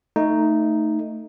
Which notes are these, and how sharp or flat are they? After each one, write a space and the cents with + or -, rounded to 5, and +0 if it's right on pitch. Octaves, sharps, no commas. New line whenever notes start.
A3 +15 D#4 +0